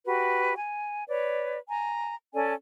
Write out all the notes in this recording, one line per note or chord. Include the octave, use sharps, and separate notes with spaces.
F#4 G4 B4
G#5
B4 C#5 D5
G#5 A#5
C#4 A4 D5 G#5